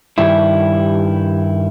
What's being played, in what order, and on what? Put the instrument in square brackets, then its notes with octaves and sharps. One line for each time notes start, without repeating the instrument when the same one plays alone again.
[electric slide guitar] G2 D#3 G3 E4